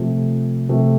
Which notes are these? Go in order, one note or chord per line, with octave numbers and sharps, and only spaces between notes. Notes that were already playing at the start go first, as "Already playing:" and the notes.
Already playing: C3 F3 A3
C3 F3 A3